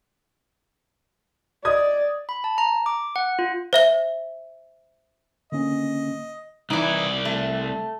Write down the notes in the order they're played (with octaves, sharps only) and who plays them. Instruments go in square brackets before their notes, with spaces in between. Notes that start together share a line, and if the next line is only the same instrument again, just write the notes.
[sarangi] D5 [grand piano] D#5 D#6 G#6
[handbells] B5
A5
A#5
D6
F#5
F4
[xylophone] C5 E5 G7
[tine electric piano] D3 A#3 C#4 [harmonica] D#5
[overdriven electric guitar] C2 D5 [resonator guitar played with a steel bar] E3 D#4
[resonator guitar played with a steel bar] A3